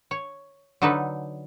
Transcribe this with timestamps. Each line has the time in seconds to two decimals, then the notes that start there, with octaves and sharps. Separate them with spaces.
0.11 C#5
0.82 D3 F#3 D#4 A4 B4